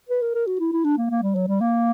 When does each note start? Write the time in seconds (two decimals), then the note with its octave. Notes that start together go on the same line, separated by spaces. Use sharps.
0.09 B4
0.22 A#4
0.35 A#4
0.47 F#4
0.60 E4
0.72 E4
0.84 D4
0.98 A#3
1.10 A#3
1.22 G3
1.35 F#3
1.48 G3
1.61 A#3